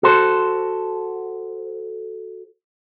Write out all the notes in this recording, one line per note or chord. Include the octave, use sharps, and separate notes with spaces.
F#4 A4 C5